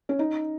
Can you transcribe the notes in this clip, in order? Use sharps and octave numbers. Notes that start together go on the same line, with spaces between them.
C#4
D#4